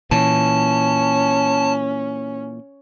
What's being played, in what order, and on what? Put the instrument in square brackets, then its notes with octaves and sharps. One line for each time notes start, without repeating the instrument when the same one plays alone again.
[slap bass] A#2 E3 [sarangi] C#4 [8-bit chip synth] A5